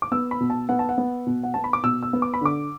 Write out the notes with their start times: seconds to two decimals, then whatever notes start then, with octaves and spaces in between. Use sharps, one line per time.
0.02 D6
0.12 B3 E6
0.31 B5
0.40 B2
0.50 A5
0.69 B3 F#5
0.79 A5
0.89 F#5
0.98 B3
1.27 B2
1.44 F#5
1.54 B3 A5
1.64 B5
1.73 D6
1.84 B2 E6
2.03 E6
2.13 B3
2.22 D6
2.34 B5
2.41 D3 D6